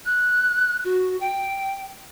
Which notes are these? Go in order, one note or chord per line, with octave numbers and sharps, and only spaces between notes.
F#6
F#4
G5